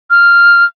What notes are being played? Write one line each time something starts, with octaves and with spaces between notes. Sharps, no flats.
F6